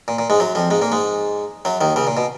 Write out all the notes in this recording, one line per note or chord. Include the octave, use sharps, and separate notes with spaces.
A#2
A#2
G#2 G#3
F#2 F#3
F2 F3
G#2 G#3
A#2 A#3
G#2 G#3
F#2 F#3
D#2 D#3
C#2 C#3
A#2
B2